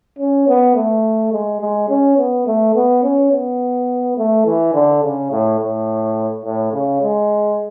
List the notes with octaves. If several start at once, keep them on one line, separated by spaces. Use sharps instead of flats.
C#4
B3
A3
G#3
G#3
C#4
B3
A3
B3
C#4
B3
A3
E3
D3
C#3
A2
A2
A2
C#3
G#3